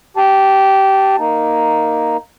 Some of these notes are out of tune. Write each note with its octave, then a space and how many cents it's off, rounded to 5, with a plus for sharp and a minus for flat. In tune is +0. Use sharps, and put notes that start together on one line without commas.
G4 -15 A5 +0
A#3 +0 D#4 +0